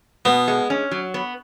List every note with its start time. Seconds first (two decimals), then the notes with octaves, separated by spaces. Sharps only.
0.25 B2 B3
0.48 G#3
0.70 C#4
0.91 F#3
1.14 B3